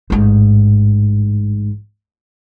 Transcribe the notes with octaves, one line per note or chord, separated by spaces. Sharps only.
A1 G#2